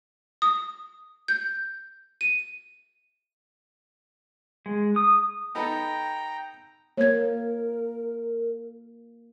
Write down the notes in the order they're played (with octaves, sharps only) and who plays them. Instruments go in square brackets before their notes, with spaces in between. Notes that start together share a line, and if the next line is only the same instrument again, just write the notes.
[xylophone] D#6
G6
D#7
[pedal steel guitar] G#3
D#6
[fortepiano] B3 D#4 A4 [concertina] G5 A#5
[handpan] A#3 [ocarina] A#4 [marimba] C#5 G#6